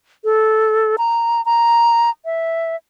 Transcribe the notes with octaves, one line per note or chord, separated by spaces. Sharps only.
A4
A#5
A#5
E5